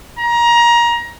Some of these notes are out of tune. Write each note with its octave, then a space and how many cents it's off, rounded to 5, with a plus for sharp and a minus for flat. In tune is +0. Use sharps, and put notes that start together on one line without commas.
A#5 +25